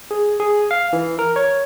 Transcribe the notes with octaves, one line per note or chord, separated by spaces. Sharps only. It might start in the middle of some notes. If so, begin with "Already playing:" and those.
G#4
G#4
F5
E3
A#4
C#5